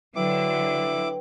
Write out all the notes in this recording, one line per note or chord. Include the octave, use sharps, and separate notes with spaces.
D3 F#3 E4 B4 G5 D6